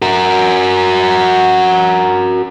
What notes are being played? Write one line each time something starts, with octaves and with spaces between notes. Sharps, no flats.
F#4 A#4